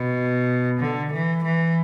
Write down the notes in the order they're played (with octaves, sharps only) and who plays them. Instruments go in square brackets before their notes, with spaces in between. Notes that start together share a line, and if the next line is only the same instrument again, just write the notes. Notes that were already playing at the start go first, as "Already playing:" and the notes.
Already playing: [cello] B2
D3
E3
E3